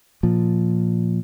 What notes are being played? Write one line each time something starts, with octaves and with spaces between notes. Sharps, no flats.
A#2 F3